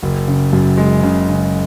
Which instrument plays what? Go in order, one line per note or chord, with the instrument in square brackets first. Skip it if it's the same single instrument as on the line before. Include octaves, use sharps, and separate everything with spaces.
[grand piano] F#1
C#3
F#2
G#3
C#3
C#3